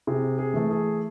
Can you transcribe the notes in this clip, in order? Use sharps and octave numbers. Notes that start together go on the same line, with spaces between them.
C3 G#4
G#4
E3 A3
G#4